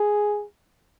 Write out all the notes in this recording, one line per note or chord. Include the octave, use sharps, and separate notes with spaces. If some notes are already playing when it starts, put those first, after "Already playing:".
Already playing: G#4